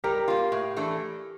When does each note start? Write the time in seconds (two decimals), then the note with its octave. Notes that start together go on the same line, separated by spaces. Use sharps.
0.04 G3 G4 A#4
0.28 A#3 F4
0.52 A2
0.76 E3 A3 D4